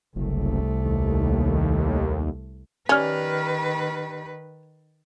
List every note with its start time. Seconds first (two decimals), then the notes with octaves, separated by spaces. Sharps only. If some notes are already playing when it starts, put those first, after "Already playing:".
0.16 F#1 C2 A3
0.85 D#2
2.89 D#3 C#4 G4 B4 D5 F6